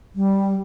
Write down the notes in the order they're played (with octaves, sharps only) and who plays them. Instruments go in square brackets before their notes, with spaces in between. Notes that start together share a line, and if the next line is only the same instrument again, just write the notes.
[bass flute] G3